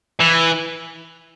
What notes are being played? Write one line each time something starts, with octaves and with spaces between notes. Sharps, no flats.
E3